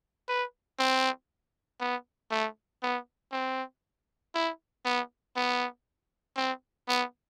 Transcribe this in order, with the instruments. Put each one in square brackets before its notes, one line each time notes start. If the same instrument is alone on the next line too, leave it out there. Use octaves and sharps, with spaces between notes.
[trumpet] B4
C4
B3
A3
B3
C4
E4
B3
B3
C4
B3